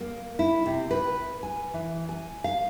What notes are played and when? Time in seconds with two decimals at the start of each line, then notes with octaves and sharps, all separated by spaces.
0.01 A#3
0.39 E4
0.66 C3
0.91 B4
1.43 G#5
1.74 E3
2.09 G#5
2.44 F5